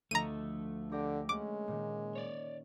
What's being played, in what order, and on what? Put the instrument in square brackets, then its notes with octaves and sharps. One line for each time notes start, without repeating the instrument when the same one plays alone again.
[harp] D2 F3 D#5 [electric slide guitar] A3 [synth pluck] A#5 D#7
[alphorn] D3 [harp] G4 D6 A#6
[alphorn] G#3 [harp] A#3 C#4 F#5 [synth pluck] D6
[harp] A#2 D#3
[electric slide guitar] C#5 D5 [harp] A6